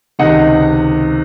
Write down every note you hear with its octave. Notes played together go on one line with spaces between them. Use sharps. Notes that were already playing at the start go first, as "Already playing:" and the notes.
C#2 C3 D#3 D#5 F#5